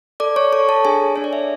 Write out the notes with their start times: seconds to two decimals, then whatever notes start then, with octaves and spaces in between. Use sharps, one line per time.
0.20 A4 D5 D6
0.36 C#5 C#6
0.53 A4 C#5 C#6
0.69 A4 A5
0.85 D4 G#4 G#5
1.16 D4 C#5
1.24 D5
1.33 E5